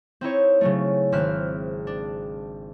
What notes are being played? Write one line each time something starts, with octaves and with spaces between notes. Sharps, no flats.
C4 D#4 E4 C#5
C#3 F#3 A3
G#1 C4 F6 F#6 B6 E7
D4